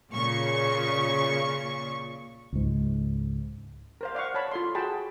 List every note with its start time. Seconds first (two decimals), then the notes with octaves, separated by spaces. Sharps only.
0.11 A#2 C#3 C#6
2.53 C#2 G#2
4.01 A#4 C5 F5
4.15 D5 F5 F#5 C#6
4.34 C#5 A5 B5
4.51 F4 A4 C6
4.75 F#4 G#4 G5 A5 B5